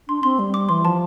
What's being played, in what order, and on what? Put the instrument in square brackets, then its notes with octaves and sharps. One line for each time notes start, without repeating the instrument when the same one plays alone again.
[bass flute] D4 [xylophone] C6
[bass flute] C4 [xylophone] C6
[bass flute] G3
[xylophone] D6
[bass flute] E3 [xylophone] C6
[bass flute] F3 [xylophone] A5